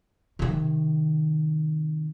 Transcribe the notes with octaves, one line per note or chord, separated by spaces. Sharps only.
C3 D#3